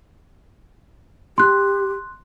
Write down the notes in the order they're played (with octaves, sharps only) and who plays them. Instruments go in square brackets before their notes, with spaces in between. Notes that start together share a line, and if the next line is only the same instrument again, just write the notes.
[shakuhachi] G4 [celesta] C6 F#6